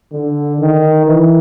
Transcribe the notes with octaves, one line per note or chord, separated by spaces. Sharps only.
D3
D#3
E3